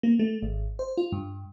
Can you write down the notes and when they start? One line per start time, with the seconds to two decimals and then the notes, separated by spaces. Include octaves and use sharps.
0.03 A#3
0.19 A3
0.43 G#1
0.79 C5
0.97 F4
1.12 G2